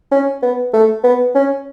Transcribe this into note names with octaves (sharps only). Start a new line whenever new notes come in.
C#4
B3
A3
B3
C#4